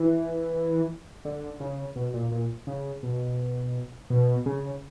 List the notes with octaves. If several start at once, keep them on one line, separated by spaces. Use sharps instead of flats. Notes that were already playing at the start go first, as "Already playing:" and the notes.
Already playing: E3
D3
C#3
B2
A#2
A#2
C#3
B2
B2
C#3